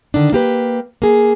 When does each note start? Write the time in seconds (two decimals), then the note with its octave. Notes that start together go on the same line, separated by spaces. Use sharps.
0.14 D3 D#3 D4
0.32 A#3 G4 B4
1.02 A#3 G#4